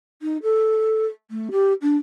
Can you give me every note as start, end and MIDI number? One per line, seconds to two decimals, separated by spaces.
0.22 0.37 63
0.42 1.05 69
1.31 1.49 57
1.51 1.73 67
1.81 1.96 62